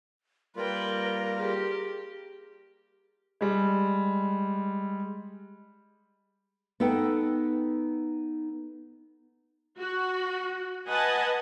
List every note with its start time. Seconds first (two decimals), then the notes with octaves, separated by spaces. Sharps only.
0.56 G3 A#3 F4 A#4 B4 G5
1.39 G4 G#4
3.41 G3 G#3
6.80 B3 D#4 A4 F#5 G5
9.79 F#4
10.87 B4 D#5 F#5 G#5 A5